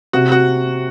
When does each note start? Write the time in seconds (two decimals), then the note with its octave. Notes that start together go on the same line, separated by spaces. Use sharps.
0.13 C3 F#4
0.32 F#4